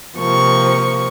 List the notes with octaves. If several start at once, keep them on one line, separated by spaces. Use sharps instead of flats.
C3 F3 A#3 C#6